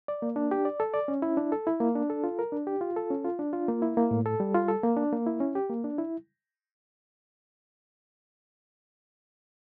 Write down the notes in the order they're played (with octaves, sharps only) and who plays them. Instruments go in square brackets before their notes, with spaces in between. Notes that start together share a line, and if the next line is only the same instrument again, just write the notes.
[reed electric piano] D5
A#3
D4
G4
D5
A4
D5
C#4
E4
D4
A4
E4
A#3
D4
A4
F4
A#4
D4
G4
F4
A4
C#4
F4
D4
F4
A#3
E4
A#3
A2
A4
G3
F4
A4
A#3
D4
A#3
E4
C#4
G4
A#3
D4
E4